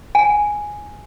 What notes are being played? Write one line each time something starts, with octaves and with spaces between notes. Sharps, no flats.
G#5